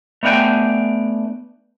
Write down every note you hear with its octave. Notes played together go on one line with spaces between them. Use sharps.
A3 B3 D4 F5 G5 G#5